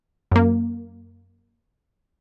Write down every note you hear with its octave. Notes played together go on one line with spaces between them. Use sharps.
F#2 A#3